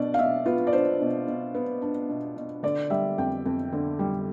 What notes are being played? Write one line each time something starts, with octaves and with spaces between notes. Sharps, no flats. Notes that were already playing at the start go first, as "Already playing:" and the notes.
Already playing: B2 D4 D5
F5
B2 E5
B3 F4
D5
D4 C5
B2
B2
B3
D4
B2
B2
D3 D5
G3 E5
F2 G5
F2
D3
G3